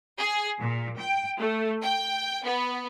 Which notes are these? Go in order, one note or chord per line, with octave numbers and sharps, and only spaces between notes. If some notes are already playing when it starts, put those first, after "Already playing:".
G#4
A#2
G5
A3
G5
B3